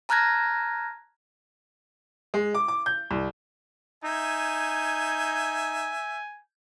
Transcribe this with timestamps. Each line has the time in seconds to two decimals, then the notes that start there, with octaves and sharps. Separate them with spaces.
0.09 A5 A#5 F6 F#6 G#6 A#6
2.34 G#3
2.54 D6
2.68 D6
2.86 G6
3.11 C2
4.04 D#4 E5 G#5 G6 G#6